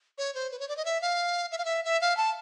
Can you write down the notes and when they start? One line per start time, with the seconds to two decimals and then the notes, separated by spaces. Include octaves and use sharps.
0.18 C#5
0.35 C5
0.51 B4
0.59 C#5
0.68 D5
0.77 D#5
0.85 E5
1.01 F5
1.52 E5
1.58 F5
1.65 E5
1.85 E5
2.01 F5
2.17 A5